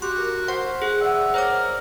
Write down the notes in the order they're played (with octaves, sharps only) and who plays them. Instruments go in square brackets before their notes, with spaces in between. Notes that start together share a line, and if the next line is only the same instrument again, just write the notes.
[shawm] F#4 [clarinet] G4 [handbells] C6
[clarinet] A#4
[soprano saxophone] C5 [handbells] F#5
[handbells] G#4 [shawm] F#5
[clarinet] D5 [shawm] E5 [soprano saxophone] F#5
[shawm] A#4 [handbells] C5 C#5 D6